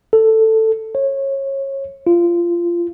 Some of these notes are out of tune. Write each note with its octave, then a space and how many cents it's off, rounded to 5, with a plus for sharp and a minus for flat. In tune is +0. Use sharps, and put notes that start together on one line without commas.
A4 +10
C#5 -25
F4 -20